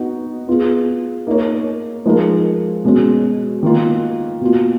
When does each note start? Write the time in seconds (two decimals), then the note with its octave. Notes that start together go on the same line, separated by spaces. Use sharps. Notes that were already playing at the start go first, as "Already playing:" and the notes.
Already playing: B3 D#4 F#4
0.47 B3 F4 G#4
1.27 A#3 D#4 A#4 C#5
2.05 F3 G#3 D#4 A#4
2.84 B2 G#3 C#4
3.63 D#3 A#3 F4
4.41 B2 A#3 F4